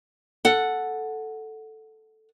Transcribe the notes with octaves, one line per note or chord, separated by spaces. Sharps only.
A4 F#5